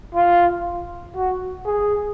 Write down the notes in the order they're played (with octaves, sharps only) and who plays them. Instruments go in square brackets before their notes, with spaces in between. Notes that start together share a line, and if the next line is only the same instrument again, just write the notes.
[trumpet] F4
F#4
G#4